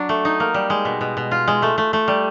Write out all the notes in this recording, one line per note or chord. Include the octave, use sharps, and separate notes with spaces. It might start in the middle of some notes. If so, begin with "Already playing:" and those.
Already playing: F#3 D4
A3
D#4
A#3
G3
G#3
B2
B2
B2
F4
G#3
A3
A3
A3
G3